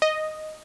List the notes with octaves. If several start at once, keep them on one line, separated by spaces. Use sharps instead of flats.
D#5